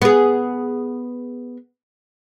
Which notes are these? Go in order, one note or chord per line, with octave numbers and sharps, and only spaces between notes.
B3 G#4